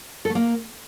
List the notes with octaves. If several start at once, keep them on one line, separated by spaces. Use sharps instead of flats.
A4
A3
A#3